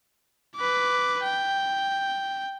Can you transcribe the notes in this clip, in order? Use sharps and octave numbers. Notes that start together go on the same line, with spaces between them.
B4 D6
G5